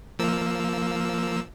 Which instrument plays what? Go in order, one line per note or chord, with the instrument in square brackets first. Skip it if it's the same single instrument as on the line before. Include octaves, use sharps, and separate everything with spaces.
[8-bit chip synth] F3 A#3 E6